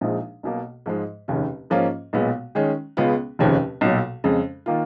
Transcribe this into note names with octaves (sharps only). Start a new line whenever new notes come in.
A#1 A#2 F3 G#3 D#4
B1 B2 A#3
G#2 F3 G#3
F1 D#2 C#3
G#2 F3 A#3 C#4 F4
B1 A#2 G#3 B3
D#3 G#3 C#4
C#2 C#3 G#3 B3 F4
F1 D#2 C#3 F3
B1 A#2 F#3
F2 C#3 G#3
D#3 A#3 F4